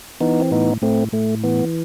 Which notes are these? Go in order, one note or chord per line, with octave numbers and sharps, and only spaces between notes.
E3 B3 D#4
C4
A2 B3 D#4
A2 A3 C4
A2 A3
E3 B3